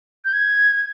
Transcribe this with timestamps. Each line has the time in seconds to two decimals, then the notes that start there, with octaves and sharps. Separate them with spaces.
0.25 G6
0.33 G#6